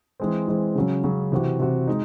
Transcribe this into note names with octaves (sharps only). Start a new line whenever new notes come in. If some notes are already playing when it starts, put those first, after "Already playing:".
E3 G#3 C4
E3 G#3 C4
C#3 F#3 C#4
C#3 F#3 C#4
C3 E3 C4 F#4
C3 E3 C4 F#4
G#3 D#4